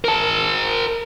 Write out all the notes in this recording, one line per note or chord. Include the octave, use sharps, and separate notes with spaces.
A#4 A5